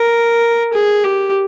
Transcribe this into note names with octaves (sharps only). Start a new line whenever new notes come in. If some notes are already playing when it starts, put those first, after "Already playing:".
Already playing: A#4
G#4
G4